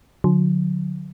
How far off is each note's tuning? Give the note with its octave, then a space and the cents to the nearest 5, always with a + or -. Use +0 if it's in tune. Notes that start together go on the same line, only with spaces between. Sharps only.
D3 +5 F#3 -35